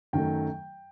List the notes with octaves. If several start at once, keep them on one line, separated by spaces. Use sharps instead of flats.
F#2 D#3 F#3 A3 G5